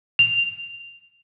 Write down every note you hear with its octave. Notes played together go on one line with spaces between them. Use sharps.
F7